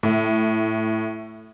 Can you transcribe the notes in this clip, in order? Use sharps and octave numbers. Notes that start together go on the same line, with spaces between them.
A2